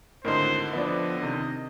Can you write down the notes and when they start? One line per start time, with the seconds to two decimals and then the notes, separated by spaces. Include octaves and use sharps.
0.25 G#1 A2 D3 A#4 C5 D#5 C6
0.73 F3 B3 D4 D#5
1.22 C3 D#3